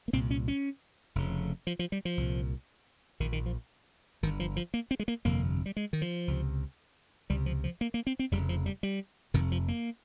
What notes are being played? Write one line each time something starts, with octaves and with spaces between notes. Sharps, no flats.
A#3
C2 A#2 C4
C#4
C#4
F1 F2 C#3
F3
F3
G3
F3
C2 A#2
A#1 A#2 D#3
D#3
F3
G1 G2 D#3
F3
F3
A#3
C4
G#3
A#3
G1 F2 C3 A#3
G3
G#3
D#3
F3
C#2 C3
C#2 C3 G3
F3
F3
A#3
A#3
C4
C4
F1 F2 C#3 G3
F3
G3
G3
F1 F2 C3 D#3
F3
A#3